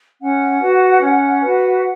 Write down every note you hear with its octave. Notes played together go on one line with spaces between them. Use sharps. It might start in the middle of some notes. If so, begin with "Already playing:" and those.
C#4 F#5
F#4 B4
C#4
F#4 B4